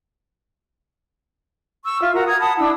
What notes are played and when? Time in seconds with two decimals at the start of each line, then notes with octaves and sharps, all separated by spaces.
1.84 C#6 E6
2.01 F4 E5
2.14 F#4 A#4 A#5
2.27 A#5 D#6 G#6
2.39 F#5 A5 B5 D#6
2.58 D4 E4 E6